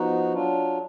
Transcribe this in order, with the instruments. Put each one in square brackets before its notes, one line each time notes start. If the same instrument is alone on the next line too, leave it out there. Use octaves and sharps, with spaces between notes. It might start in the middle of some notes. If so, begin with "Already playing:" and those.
Already playing: [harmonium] F3 B3 D#4 F#4
F#3 D4 F4